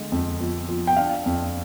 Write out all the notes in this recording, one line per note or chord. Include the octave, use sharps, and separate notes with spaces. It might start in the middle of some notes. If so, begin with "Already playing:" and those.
Already playing: D3 G#3
F2
F3
F3
G5
D4 F5
F2